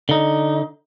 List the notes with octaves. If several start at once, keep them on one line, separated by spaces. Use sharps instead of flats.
D3 D#4